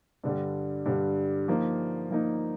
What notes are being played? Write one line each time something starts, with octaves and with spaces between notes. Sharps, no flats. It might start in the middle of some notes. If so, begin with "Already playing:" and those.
G2 D3 G3
G2 D3 G3
F3 A#3 D#4
F3 A#3 D#4